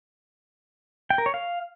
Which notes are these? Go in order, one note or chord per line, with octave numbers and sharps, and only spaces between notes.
G5
A#4
C#5
F5